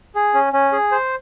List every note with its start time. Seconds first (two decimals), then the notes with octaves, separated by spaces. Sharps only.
0.15 G#4
0.34 C#4
0.53 C#4
0.72 G#4
0.91 C5